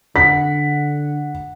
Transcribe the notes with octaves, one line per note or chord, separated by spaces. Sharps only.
D3 F#5 B6